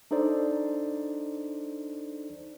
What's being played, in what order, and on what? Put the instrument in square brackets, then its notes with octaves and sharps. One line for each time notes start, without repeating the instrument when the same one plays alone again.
[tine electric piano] D4 D#4 A4 C5 D5